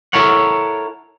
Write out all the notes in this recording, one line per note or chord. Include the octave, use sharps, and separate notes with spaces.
E4 A4 A#4 C#5 F#5